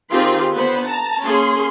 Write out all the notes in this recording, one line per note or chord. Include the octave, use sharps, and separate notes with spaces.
D#3 C4 F4 G4 G#4 C6
D3 B3 C5 B5
A5 A#5
A#3 C#4 G#4 C6